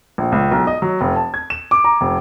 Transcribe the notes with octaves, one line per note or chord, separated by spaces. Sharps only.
A#1
C#2
B1
D#5
F#3
F1
A5
G#6
E7
D6
A#5
F1